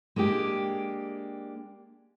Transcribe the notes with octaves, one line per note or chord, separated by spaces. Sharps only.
G#3 A#3 D4 G4